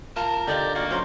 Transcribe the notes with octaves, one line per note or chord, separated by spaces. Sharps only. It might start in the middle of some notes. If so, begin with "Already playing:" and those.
F4 A#4 A5
D3 D#4 F4 G4 D5
A#3 F#4 D5
F#3 C#4 C5 C6